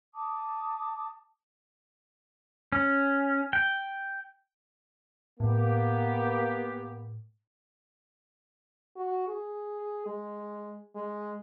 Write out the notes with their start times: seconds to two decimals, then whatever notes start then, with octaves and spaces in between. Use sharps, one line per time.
0.14 A5 D6 D#6
2.72 C#4
3.53 G5
5.40 A2 A#3 B3 G4
8.96 F#4
9.27 G#4
10.06 G#3
10.95 G#3